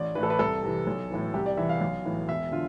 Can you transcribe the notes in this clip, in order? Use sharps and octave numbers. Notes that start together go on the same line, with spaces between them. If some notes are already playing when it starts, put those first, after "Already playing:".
Already playing: A1 D5
A2 E3 B4
A4
B4
C2 A4
C3 E3
B1
A2 E3
C2 G4
D5
C3 E3 E5
F5
B1
A2 E3
E1 E5
D3 F4